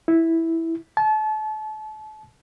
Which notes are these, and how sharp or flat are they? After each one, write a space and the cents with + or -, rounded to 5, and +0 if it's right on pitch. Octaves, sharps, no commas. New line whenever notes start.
E4 -5
A5 -35